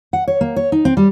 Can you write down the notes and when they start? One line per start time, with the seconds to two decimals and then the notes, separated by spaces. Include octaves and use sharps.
0.13 F#5
0.28 C#5
0.41 A#3
0.56 C#5
0.72 D#4
0.85 C4
0.97 G3